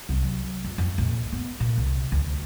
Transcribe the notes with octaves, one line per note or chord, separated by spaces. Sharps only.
C2
F#3
F2
F2
A#1
B3
A#2
C2
D2